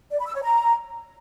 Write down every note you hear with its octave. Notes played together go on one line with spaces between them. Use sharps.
D5
B5
E6
C#5
A#5